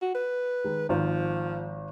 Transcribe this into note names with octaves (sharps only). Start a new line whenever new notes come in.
F#4
B4
D#3 G#3
G#1 D#3 F3 C5